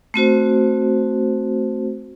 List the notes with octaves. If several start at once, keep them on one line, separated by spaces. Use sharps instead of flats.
A3 C4 F#4 C5